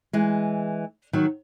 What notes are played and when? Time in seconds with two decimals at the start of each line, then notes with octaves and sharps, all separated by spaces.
0.13 E3 G#3
1.13 D#3 F#3